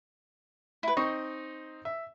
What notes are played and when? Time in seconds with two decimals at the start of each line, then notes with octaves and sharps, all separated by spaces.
0.83 E4 B4
0.97 C4 D#4 D#5 C#6
1.85 E5